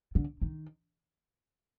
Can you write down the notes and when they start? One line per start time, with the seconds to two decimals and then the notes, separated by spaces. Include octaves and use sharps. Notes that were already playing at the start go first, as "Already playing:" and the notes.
0.15 D3
0.42 D#3